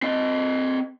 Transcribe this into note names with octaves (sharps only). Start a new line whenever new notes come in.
C4 D#5